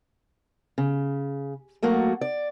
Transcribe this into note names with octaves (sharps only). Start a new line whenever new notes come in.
C#3
F#3 A3 A#3 F#4
D5